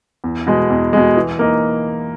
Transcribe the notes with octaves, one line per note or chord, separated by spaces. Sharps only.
E2
B2 G#3
E2
B2 G#3
E3
A#3 D#4